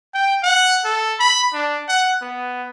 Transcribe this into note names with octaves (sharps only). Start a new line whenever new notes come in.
G5
F#5
A4
B5
D4
F#5
B3